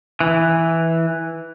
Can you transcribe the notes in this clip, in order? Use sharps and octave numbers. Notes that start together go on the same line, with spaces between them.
E3